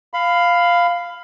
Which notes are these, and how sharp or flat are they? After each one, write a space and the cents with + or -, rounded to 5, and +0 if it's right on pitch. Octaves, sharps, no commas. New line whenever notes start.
F5 +0 B5 +20